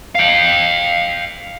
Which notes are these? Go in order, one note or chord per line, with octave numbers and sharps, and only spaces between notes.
F5 G5